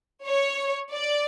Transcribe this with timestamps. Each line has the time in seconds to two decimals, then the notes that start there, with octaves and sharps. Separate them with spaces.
0.26 C#5
0.92 D5